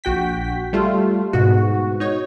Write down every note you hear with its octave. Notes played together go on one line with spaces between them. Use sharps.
A#1 F#4 G5 B6
G3 A3 F4
G#2 B2 F#4
D#4 C#5